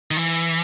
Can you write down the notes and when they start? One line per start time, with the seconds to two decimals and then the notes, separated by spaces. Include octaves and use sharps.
0.11 D#3
0.17 E3